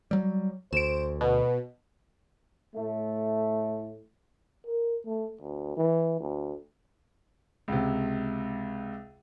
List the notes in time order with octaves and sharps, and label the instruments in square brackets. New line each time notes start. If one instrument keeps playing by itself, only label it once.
[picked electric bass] F#3 G3
[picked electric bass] D2 [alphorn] C5 [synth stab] D7 E7
[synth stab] B2 [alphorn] B4
[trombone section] A2 A3
[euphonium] A#4
A3
D2
E3
D2
[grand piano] C#2 C3